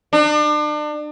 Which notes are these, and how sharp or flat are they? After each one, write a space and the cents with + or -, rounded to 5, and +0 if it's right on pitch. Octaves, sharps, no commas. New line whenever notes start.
D4 +35